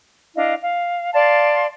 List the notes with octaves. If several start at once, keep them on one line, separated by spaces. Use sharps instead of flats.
D4 E4 D#5 F5
F5
D5 F5 A5 C6